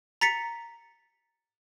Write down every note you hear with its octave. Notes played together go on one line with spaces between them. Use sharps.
A#5 A6 B6 C#7